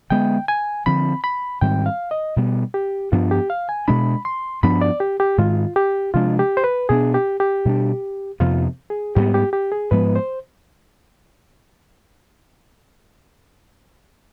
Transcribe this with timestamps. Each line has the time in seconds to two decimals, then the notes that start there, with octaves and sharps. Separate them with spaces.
0.10 D3 G#3 B3 G5
0.48 G#5
0.86 D3 F3 C4 B5
1.24 B5
1.61 G#2 D#3 G3 C4 G5
1.86 F5
2.11 D#5
2.36 B2 G3 B3
2.74 G4
3.12 G2 F3 B3 D4 F4
3.31 G4
3.50 F5
3.69 G#5
3.88 B2 G#3 D4 B5
4.25 C6
4.63 G2 F3 B3 D4 B5
4.81 D5
5.00 G4
5.20 G4
5.38 G#2 D#3 G#3 F4
5.76 G4
6.14 C3 F3 G#3 D4 F4
6.39 G4
6.57 C5
6.64 B4
6.89 B2 B3 D4 G#4
7.14 G4
7.40 G4
7.65 B2 G3 B3 D4
8.40 F2 C3 F3 B3 F4
8.90 G#4
9.16 G#2 G3 B3 G4
9.34 G4
9.53 G4
9.72 G#4
9.91 G#2 F3 G#3 B3 B4
10.16 C5